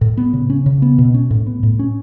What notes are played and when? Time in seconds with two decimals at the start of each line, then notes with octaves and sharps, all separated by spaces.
0.01 A2
0.17 B3
0.33 C#3
0.50 C#4
0.66 C#3
0.82 B3
0.98 B2
1.14 C#4
1.31 A2
1.47 B3
1.63 A2
1.79 C#4